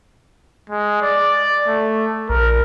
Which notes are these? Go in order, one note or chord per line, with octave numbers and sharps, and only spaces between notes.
G#3
D5
A3
A#1 A#4